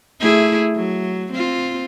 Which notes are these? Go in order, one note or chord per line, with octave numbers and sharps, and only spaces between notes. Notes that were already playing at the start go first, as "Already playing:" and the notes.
A3 E4 G#4
F#3
C4 F4